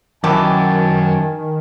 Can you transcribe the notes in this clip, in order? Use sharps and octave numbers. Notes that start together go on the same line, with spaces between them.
F#2 D#3 E3 A3 G4 D#5 G#5 A5